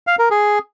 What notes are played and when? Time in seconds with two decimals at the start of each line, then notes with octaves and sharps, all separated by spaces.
0.07 F5
0.19 A#4
0.31 G#4